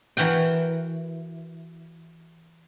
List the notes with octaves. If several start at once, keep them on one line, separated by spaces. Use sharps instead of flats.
E3 F#4 A#4 G5